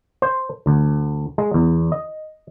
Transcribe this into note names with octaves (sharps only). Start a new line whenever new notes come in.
C5
D2
G#3
E2
D#5